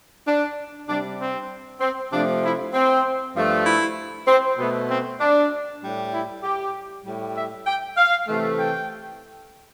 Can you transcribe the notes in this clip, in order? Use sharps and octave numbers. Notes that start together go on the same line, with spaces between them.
D4
C3 G3 D4
C4
C4
C3 F3 A3 D4
E4
C4
G2 F3 A3
E4
C4
B2 A3 B3
C4
D4
A2 G3
E4
G4
A2 G3
E5
G5
F5
C3 E3 A3
G5